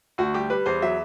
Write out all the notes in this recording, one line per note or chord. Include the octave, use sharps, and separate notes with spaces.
D2 F#4
G3 G4
G3 B4
E2 C5
F#3 E5